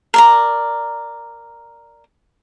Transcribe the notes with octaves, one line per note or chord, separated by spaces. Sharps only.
A#4 D5 A#5